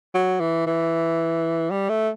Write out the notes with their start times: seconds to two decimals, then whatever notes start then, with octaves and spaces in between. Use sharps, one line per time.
0.14 F#3
0.40 E3
0.67 E3
1.70 G3
1.89 A3